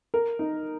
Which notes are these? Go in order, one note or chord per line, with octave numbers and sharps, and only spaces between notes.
A#4
D#4